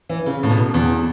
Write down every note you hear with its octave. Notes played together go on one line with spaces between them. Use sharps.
E3
C#3
A2
B2
E2